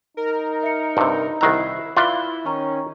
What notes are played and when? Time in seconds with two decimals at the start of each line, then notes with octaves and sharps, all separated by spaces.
0.17 D#4 A#4
0.63 E5 C#7
0.97 G2 C3
1.41 C2 D#3 E4 A#5 E6 F#6 C7
1.97 E4 F4 B4 D5 E5 G7
2.46 D#3 C#4 A#5 C#6